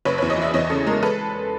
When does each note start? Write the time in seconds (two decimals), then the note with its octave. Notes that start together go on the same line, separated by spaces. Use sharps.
0.05 F#1 B4 C#5
0.18 B4 C#5
0.22 E2
0.30 C#5 D#5
0.38 E3 D5 E5
0.54 E2 C#5 D#5
0.70 C#3 A4
0.87 G#3 A#4
1.03 A4 B4